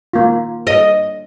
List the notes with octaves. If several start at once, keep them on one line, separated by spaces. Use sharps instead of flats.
A#3 F4
D#5